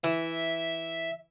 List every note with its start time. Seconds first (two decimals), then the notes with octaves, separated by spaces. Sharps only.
0.04 E3 E5